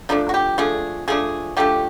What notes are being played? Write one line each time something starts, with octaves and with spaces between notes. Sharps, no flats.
F3 A3 D4 D#4
F#4
G4
F3 A3 D4 G#4
F3 A3 D4 G#4
F3 A3 D4 G4